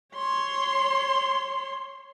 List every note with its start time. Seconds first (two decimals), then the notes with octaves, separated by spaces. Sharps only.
0.15 C#5 C6